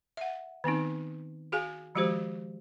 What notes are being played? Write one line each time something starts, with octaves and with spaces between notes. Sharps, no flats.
E5 F#5
D#3 B3 C4 D#4
F#4 G#4 F5 G#5
D#3 F3 G#3 F#4 G4 C5